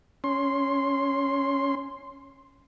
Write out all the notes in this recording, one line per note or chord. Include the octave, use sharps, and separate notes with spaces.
C#4 C6